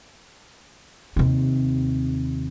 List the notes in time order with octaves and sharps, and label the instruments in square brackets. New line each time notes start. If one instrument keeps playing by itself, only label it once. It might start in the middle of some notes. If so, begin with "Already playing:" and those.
[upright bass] D#2 C3